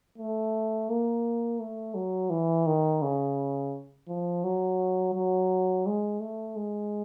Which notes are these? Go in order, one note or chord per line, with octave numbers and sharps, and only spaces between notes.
A3
A#3
A3
F#3
E3
D#3
C#3
F3
F#3
F#3
G#3
A3
G#3